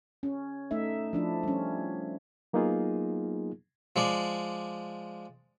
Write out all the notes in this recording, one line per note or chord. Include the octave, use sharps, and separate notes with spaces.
C#4
A3 D#4 E5
F3 D4 E4
G3 C#4
F#3 A#3 B3 D#4 F4 G#4
F3 G#3 D5